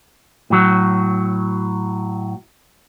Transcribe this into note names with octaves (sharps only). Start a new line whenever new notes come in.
A2 F#3